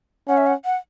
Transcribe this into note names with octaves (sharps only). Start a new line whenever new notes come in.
C#4 F#5
E5
F#5
F#5